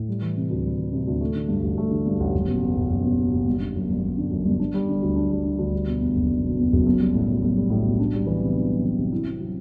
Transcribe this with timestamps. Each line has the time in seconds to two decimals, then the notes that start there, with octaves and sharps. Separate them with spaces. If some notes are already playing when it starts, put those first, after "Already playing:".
Already playing: A2
0.08 G3
0.22 E3
0.37 C3
0.50 D2
0.64 G3
0.78 E3
0.92 C3
1.07 D2
1.21 A3
1.35 D3
1.48 G2
1.63 A1
1.77 A3
1.91 D3
2.06 G2
2.20 A1
2.34 F#1
2.48 B2
2.62 E2
2.76 F#1
2.90 F#1
3.04 B2
3.19 E2
3.33 F#1
3.47 G1
3.60 D3
3.75 F#2
3.89 G1
4.03 G1
4.18 D3
4.31 F#2
4.45 G1
4.59 D4
4.74 G3
4.88 D3
5.02 D2
5.16 D4
5.30 G3
5.45 D3
5.58 D2
5.73 G3
5.87 B2
6.01 E2
6.15 F#1
6.30 G3
6.43 B2
6.57 E2
6.72 F#1
6.86 B1
6.99 G3
7.14 A2
7.28 B1
7.42 B1
7.56 G3
7.70 A2
7.85 B1
8.00 D4
8.14 G3
8.27 E3
8.42 C3
8.55 D4
8.70 G3
8.84 E3
8.97 C3
9.12 E4
9.26 C4
9.40 F#3